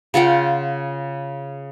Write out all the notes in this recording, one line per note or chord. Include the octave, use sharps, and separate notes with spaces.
C#3 F4 F#5 G5